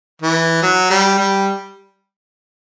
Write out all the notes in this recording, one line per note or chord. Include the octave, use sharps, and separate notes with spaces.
E3
F#3
G3
G3